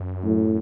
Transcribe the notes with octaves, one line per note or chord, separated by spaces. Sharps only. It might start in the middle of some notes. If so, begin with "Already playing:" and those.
Already playing: F#2
A2